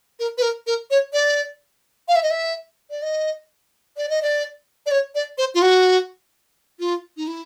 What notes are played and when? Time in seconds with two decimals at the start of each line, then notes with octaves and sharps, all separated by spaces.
0.20 A#4
0.38 B4
0.42 A#4
0.67 A#4
0.90 C#5
1.13 D5
2.08 F5
2.16 E5
2.23 D#5
2.30 E5
2.91 D5
3.02 D#5
3.97 D5
4.09 D#5
4.22 D5
4.86 D5
4.91 C#5
5.15 D5
5.38 C5
5.55 F4
5.62 F#4
6.80 F4
7.17 D#4
7.27 E4